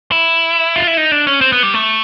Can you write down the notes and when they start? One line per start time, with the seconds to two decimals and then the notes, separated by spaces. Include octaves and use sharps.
0.12 E4
0.76 F4
0.87 E4
0.97 D#4
1.12 D4
1.27 C#4
1.41 C4
1.52 B3
1.63 G3
1.74 A3